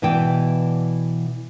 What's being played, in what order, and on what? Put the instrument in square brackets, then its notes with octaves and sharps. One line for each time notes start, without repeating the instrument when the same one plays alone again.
[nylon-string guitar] B2 E3 D5 G5